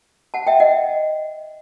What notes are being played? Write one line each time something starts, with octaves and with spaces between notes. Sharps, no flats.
F#5 A5
E5 G5
D#5 F#5